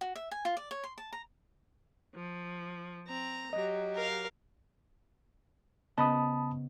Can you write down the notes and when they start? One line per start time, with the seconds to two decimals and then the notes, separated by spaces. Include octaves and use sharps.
0.01 F#4
0.15 E5
0.31 G#5
0.45 F4
0.57 D5
0.71 C#5
0.84 C6
0.98 A5
1.13 A#5
2.15 F3
3.07 C4 A#5
3.53 F#3 G4 D#5
3.95 A#4 F5
5.98 C#3 B3 D#5 A5 B5 D#6